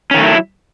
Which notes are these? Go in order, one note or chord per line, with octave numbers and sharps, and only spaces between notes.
D#3 F#3 A3 C#4 E4